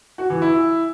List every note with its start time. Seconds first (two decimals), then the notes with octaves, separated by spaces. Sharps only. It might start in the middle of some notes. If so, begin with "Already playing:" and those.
0.18 F#4
0.30 E3
0.42 E4